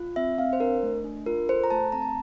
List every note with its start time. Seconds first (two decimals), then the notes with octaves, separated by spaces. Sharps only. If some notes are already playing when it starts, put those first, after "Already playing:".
Already playing: F4
0.16 C4 E5
0.38 C4 F5
0.53 C5
0.60 D4 A#4
0.83 A3
1.04 D4
1.26 F4 A#4
1.49 A4 C5
1.64 A#5
1.70 A3 A5
1.92 C4 A#5
2.02 A5